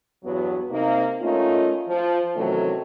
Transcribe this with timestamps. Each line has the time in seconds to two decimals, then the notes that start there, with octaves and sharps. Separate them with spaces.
0.24 E2 G2 F#3 B3
0.70 C3 A#3 D#4
1.21 A3 A#3 C#4 D#4 F4
1.89 F3 F4
2.36 C3 D#3 E3 F#3 A3 C#4